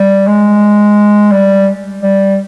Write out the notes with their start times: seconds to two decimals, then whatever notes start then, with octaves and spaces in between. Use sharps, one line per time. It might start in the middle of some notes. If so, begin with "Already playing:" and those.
Already playing: G3
0.27 G#3
1.32 G3
2.03 G3